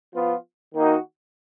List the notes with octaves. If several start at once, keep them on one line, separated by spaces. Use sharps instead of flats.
F3 B3 F4
D#3 A#3 D#4 F#4